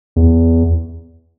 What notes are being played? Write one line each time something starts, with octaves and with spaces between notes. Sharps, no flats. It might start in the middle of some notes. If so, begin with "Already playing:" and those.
E2